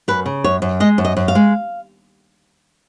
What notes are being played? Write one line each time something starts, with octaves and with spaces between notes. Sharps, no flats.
F#2 B4
C#3
F#2 C#5
F#2
G#3 D#5
F#2
D#5
F#2
F5
G#3